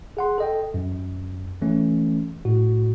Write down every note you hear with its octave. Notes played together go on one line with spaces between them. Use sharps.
G#4 F#5 C6
A4 D#5 G5
F#2
E3 A3 C#4
A2 F#4